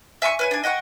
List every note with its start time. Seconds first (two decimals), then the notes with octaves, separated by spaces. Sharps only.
0.22 E5 G#5 C6 C#6
0.39 B4 C#5 G#5
0.51 D4 G#5
0.64 D#5 F#5 G5 C#6